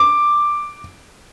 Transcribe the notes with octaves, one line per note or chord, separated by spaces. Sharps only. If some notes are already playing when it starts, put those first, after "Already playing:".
Already playing: D6